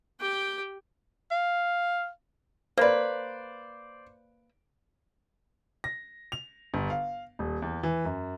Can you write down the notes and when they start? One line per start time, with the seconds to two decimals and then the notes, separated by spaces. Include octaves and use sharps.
0.20 G4 G5
1.32 F5
2.77 A#3 B4 C5 D5
5.84 A#6
6.32 F7
6.74 G1
6.90 F5
7.39 D#1
7.62 E2
7.83 E3
8.05 F#2